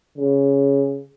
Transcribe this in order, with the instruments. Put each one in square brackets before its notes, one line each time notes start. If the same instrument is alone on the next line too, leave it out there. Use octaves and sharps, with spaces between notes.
[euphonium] C#3